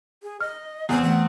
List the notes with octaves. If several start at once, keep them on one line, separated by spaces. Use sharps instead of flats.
G#4
D#5 F6
E2 B3 C4 G#5
E3 A3 F#5